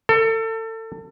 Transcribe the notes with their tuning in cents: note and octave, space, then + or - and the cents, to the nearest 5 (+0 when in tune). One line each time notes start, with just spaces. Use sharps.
A4 +30